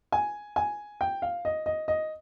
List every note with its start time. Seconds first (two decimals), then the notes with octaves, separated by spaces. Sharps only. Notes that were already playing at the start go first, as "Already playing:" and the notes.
0.12 G#5
0.56 G#5
1.01 G5
1.22 F5
1.45 D#5
1.66 D#5
1.88 D#5